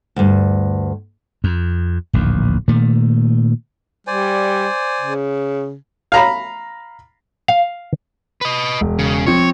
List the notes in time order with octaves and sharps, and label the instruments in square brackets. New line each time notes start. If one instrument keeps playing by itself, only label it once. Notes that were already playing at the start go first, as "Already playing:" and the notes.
[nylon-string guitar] D2 G2
[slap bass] F2
D1 A#1 D#2
A#2 D#3 A3
[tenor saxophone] G3 [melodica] C5 D5 G#5
[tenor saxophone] C#3
[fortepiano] F5 A#5 B5
[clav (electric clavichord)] F5
[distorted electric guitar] B4 D#5
[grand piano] E1
[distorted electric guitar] C#3
[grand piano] F3 C4 [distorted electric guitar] C#5